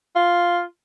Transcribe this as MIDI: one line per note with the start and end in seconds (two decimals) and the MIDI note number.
0.15 0.63 65